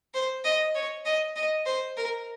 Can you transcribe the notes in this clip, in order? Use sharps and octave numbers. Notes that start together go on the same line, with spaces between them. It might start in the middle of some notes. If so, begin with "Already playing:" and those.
C5
D#5
C#5
D#5
D#5
C5
A#4